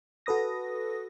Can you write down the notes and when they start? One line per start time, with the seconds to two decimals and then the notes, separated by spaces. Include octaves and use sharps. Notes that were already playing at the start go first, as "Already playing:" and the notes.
0.26 F#4 A4 B4 D#6 A#6